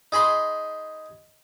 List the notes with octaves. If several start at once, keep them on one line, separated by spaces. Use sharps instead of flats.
D#4 G#4 B5 C6